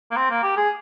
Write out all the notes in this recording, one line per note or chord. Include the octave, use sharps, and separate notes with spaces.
A#3
C4
A#3
G4
G#4